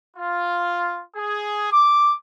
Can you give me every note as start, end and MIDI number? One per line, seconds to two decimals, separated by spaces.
0.16 1.02 65
1.15 1.71 68
1.72 2.15 86